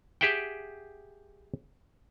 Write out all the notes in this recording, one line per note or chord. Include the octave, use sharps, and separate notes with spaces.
G4 G#4 E5 F#5 G5